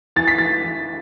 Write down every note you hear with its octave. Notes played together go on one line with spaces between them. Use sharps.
E3 A6
B6
E3 A6
E3